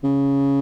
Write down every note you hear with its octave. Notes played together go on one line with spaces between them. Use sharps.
C#3